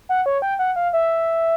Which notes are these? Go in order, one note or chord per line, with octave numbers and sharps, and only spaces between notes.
F#5
C#5
G5
F#5
F5
E5